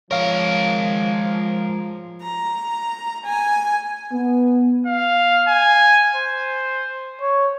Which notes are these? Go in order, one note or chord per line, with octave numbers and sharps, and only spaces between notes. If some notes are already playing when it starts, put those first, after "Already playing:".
F3 G#3 A#4 C#5 F5
A#5
G#5
B3
F5
G#5
C5
C#5